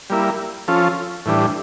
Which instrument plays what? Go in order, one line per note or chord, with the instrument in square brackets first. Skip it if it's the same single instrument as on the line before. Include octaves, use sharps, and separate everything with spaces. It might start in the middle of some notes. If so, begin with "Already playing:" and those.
[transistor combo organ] G3 A#3 E4
F3 C#4 F4 A4
A2 E3 G3 D4